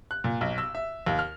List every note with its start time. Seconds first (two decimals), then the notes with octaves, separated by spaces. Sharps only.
0.11 F#6
0.24 A#2
0.41 B1
0.58 E6
0.75 E5
1.06 D#2
1.19 F6